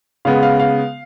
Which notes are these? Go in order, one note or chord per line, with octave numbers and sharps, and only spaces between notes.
C#3 G#3 B3 F5
F5
F5